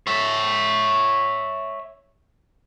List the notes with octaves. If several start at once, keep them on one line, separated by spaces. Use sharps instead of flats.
C#5 E5